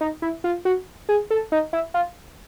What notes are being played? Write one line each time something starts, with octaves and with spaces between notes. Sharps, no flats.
D#4
E4
F4
F#4
G#4
A4
D#4
E4
F4